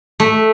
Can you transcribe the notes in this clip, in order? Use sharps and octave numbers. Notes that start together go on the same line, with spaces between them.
A3